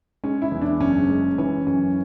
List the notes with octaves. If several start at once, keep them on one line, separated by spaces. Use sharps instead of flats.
G#3 C#4
E4
E2
D4
F#1 C#4
G#3
E3 C#4
F#2 C#4